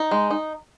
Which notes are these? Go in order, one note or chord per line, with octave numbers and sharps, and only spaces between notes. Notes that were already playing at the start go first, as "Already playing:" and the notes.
Already playing: D#4
G#3
D#4